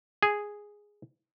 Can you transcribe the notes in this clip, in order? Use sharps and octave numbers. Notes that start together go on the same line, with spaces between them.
G#4